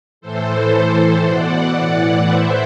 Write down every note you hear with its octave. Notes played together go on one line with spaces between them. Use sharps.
A2 E3 A4 C5
A2 E3 A4 C5
B2 D5 F#5
A2 E3
A2 E3 C5 E5